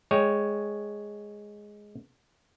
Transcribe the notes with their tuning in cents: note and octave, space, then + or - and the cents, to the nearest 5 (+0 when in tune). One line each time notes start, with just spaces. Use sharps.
G#3 +0 C#5 +0 G5 +0